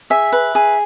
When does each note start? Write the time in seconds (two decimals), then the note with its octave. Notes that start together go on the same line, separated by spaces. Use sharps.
0.10 G#4 E5
0.32 B4
0.55 G#4